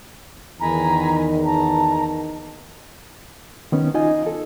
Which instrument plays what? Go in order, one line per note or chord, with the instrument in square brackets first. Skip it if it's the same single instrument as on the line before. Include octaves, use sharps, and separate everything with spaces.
[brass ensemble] E2 D#3 [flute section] G#5 A#5 B5
[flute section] A5 A#5
[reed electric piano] D#3 B3 C#4
D#4 F4 D#5 G#5
A4